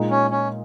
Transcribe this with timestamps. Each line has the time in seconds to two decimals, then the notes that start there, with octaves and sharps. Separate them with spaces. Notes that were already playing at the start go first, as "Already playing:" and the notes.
Already playing: A#2 G#3 D#4
0.10 C#4
0.31 C#4